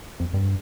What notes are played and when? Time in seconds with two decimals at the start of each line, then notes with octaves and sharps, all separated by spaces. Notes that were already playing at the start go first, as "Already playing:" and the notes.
0.20 F2
0.33 G2